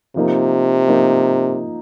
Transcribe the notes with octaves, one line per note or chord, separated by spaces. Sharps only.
C3 F3 A#3 D#4
F3 A#3 D#4